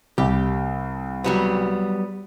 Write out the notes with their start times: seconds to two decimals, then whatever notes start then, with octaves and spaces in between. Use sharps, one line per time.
0.18 C2 G4
1.24 F#3 G3 B3